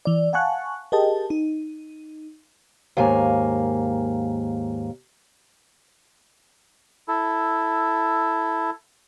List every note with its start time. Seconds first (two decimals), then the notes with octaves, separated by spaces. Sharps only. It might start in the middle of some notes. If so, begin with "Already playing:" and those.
0.05 E3 D5
0.33 F5 F#5 G#5 A5 C#6 F#6
0.92 G4 G#4 A#4 D#5 G5 A5
1.30 D#4
2.97 D#2 G#2 A#3 G#5
7.08 E4 A4